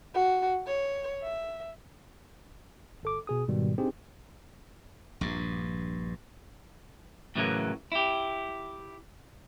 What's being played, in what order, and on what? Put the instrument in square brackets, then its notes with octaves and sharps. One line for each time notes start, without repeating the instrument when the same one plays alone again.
[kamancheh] F#4
C#5
E5
[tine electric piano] G1 A4 D6
B2 G#4 D#6
G#2 B2 D#3 G3
C4 D4 D#4 G4 G#4
[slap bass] A#1 G2
[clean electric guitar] A2 C#3 E3 F#3 G#3 A#3
E4 G4